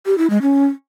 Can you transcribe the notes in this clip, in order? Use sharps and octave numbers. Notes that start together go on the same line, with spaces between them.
G4
E4
G#3
C#4